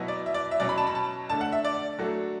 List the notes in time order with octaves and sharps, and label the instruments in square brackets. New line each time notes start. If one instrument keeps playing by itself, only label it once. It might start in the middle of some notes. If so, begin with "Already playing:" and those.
Already playing: [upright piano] B2 F#3 B3 E4
[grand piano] D5
E5
D5
E5
[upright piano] B2 F#3 C#4 [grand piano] D5
[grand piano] B5
A5
B5
A5
[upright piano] D3 A3 D4 [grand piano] A5
[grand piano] F#5
E5
D5
[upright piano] F#3 A3 D4 F#4 A4